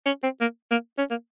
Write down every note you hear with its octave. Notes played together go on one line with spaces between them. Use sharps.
C#4
C4
A#3
A#3
C#4
A#3